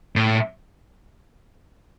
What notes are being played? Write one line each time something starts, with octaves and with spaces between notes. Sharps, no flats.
A2